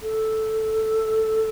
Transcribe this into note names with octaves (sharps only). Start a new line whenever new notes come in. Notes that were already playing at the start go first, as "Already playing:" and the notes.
A4